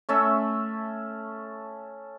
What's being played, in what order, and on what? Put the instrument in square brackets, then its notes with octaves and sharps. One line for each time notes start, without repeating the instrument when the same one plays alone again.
[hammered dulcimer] A3 C#4 A4 E5